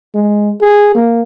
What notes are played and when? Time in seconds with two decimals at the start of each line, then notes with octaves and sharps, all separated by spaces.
0.15 G#3
0.61 G#4
0.94 A#3